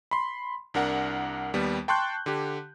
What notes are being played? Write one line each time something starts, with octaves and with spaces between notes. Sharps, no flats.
B5 C6
C2 D4 A#4 F#5
D#2 G3 B3
G5 A5 C6 C#6 F#6 G6
D3 G4